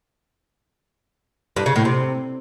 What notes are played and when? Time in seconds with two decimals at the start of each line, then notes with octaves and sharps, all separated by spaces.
1.56 G2
1.66 C#3
1.76 A2
1.85 C3